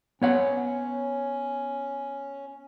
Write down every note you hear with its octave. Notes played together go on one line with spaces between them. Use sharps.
B3 C#4 C#5 F#5